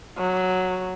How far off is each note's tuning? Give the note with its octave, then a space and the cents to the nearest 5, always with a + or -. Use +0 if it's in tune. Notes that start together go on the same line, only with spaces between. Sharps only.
F#3 -5